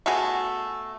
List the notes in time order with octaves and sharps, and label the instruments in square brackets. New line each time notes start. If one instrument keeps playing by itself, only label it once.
[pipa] A3 B3 F#4 G#4